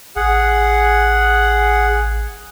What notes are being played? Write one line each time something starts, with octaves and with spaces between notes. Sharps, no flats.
A1 G#4 F#5